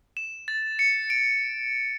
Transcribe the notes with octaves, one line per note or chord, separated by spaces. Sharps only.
E7
A6
C#7
D7